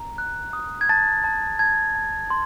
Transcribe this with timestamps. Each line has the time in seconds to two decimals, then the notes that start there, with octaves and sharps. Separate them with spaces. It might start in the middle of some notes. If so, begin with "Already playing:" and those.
Already playing: A#5
0.18 F#6
0.53 D#6
0.81 G#6
0.89 A5 A6
1.24 A5
1.59 A5 G#6
1.95 A5
2.30 C6